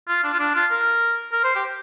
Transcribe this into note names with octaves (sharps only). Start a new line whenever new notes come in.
F4
D4
F4
D4
F4
A#4
A#4
C5
G4